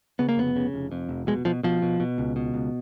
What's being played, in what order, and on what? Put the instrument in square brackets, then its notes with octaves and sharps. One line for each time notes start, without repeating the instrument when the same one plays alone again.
[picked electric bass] C#3 B3
A#3
F1 B3
C#3
F1
F2
F1
B2 G#3
B2 F3
B2 F3
B2
B2
C#2
B2
C#2